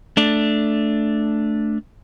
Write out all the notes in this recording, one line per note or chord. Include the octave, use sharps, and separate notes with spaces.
A3 D4